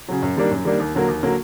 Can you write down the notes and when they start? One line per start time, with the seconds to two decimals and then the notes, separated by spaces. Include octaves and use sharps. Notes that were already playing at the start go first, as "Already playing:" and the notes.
0.08 C#3 F#3
0.23 F#2
0.37 D#3 G3 A#3 D4
0.51 F#2
0.65 D#3 G3 A#3 D4
0.80 D#2
0.95 D3 F#3 A#3
1.08 D#2
1.23 D3 F#3 A#3